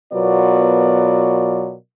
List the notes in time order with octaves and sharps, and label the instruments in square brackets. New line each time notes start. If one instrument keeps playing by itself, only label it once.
[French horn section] B2 F#3 B3 F4 A#4 D5